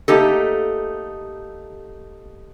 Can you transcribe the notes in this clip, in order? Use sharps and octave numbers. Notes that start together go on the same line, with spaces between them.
A3 A#3 D#4 G4 A4